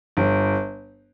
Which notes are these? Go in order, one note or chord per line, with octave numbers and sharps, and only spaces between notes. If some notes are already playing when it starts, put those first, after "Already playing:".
G1